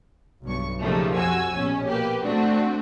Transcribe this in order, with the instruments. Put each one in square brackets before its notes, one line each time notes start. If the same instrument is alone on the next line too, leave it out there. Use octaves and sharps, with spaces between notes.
[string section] B1 G2 C#6
C#3 F3 G3 A3 A#3 D#4
F2 F#4 G#5 E6
A#1 B2 C#4
A#3 G4 B4
A3 C4 D4 F#4